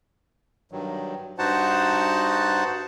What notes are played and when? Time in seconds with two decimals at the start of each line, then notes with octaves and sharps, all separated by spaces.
0.72 G2 D#3 F#3
1.38 G2 D#4 F#4 C5 F#5 A5